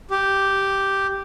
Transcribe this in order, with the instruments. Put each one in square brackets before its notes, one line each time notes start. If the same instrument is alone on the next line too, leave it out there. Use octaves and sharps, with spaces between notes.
[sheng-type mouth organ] G4